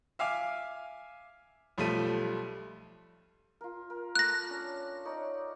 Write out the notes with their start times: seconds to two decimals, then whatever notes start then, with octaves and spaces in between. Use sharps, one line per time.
0.19 E5 F5 G#5 D6 F6
1.78 B1 F3 G3 A3 B6 D#7
3.61 F4 A#4
3.90 A#4
4.15 A#3 F4 A4 F#6 A#6
4.50 C#4 D4
5.05 D#4 C#5 D5